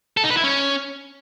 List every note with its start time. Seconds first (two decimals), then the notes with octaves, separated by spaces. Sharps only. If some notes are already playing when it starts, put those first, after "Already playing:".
0.17 A4
0.24 D#4
0.30 B4
0.37 E4
0.44 C#4